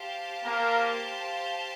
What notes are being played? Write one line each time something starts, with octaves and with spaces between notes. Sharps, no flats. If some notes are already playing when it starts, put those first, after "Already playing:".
Already playing: G4 C5 F5 A5
A#3 A#4